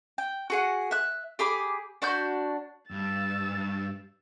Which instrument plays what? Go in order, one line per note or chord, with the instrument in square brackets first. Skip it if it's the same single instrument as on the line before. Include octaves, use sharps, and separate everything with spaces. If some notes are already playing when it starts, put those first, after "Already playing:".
[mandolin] G5
F#4 G#4 F#5
E5 F#6
G4 G#4 B5 D6
D4 F#4 B5 G6
[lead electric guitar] G2 [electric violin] E6 A6